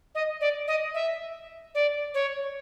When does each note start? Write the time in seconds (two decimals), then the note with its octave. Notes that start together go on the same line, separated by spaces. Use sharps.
0.15 D#5
0.41 D5
0.68 D#5
0.94 E5
1.75 D5
2.14 C#5